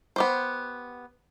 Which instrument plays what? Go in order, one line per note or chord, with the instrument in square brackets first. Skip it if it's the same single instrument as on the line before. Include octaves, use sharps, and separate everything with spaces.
[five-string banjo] B3 G4 C5